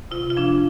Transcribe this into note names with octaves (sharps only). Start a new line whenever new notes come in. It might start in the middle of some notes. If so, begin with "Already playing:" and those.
C3 F4
F4
F3 D4